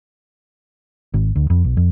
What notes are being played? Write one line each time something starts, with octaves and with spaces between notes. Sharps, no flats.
G#1
D2
F2
B1
F2